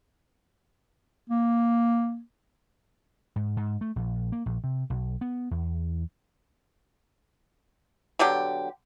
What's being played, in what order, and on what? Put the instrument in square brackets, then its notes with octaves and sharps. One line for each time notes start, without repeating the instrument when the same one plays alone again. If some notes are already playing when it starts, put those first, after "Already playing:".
[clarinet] A#3
[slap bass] G#2
G#2
A3
A#1
A#3
A#1
C3
B1
B3
E2
[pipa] B2 D3 F#3 G4